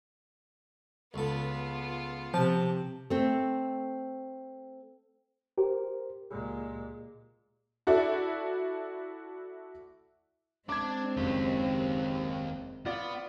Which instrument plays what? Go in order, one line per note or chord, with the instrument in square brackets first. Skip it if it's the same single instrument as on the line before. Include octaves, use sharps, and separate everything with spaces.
[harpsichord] C#2 A4 [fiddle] B3 F4
[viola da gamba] C3 [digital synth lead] F3 [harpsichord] A5
[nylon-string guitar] A3 C4
[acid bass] G4 [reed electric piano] A#4 C5
[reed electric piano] C#2 G#4 [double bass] A#2 G#3
[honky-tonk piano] E4 F#4 A4 D5 E5
[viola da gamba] G#3 C4 [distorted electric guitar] D4 D5 [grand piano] D6 G#6
[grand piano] F#1 [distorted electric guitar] D#2 G4
[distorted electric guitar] B3 [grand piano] F4 D5